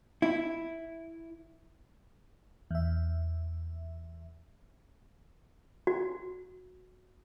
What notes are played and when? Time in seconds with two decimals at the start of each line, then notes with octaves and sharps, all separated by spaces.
0.22 E4
2.71 E2 E5
5.87 F#4